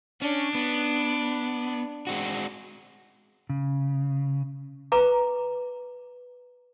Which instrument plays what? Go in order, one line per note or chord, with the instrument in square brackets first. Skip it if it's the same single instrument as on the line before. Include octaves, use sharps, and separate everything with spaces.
[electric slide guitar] C#4 [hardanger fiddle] D4
[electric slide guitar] B3
G#3 C4 F#4
C#3
[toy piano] B4 A#5 D6